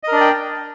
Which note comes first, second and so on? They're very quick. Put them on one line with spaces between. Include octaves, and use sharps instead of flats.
D#5 A#4 D4 D5 G5